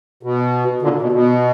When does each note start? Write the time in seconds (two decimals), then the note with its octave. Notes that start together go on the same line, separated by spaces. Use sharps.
0.23 B2
0.82 A#2 D3
1.02 B2
1.12 B2